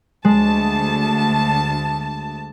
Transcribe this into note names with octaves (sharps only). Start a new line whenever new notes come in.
D2 G#3 A5